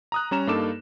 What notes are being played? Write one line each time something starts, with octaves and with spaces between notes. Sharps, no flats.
A#5 D#6 F#6
G3 C#4 A#5 E7
G2 A#3 D#4 A4 D6 E7